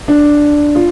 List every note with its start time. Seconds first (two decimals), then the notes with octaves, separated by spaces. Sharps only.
0.08 D4
0.75 F4